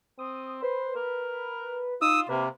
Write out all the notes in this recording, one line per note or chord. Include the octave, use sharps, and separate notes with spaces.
C4 D#6
B4 C5
A#4
D#4 F4 D#6 E6
C3 A#3 B4